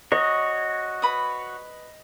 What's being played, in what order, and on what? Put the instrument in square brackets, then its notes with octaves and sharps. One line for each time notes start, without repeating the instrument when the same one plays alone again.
[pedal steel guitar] F#4 C#5 [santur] D#5
[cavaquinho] B4 B5 D#6